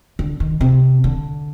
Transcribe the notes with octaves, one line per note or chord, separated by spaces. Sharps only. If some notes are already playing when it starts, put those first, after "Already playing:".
D3
D#3
C3
D3